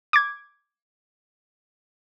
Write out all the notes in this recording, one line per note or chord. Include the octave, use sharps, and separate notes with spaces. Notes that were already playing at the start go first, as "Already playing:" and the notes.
D6 G#6